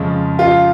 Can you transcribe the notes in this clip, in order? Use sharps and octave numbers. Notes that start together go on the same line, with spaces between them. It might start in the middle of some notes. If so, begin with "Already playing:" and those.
Already playing: F2 C#3 F3 G#3
F4